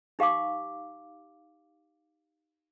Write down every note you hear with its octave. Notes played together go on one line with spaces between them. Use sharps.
D#4 G4 F5 C6 D6